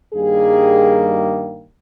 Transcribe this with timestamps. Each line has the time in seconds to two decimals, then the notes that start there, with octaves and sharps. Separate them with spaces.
0.14 G2 D#3 G3 A#3 G#4